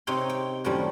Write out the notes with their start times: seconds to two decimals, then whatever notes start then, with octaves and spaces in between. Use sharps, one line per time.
0.07 C3 D#4 C#5 G5 C6
0.29 G5
0.64 F#2 A2 D#3 F3 G3